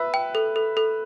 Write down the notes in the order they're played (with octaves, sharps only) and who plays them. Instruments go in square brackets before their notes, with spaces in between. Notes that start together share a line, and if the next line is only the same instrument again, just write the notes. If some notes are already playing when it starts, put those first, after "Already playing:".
Already playing: [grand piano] B4 E5 [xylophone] E6
[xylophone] G5
A4
A4
A4